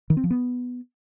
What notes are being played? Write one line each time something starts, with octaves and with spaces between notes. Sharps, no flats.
D#3
C4
F3
B3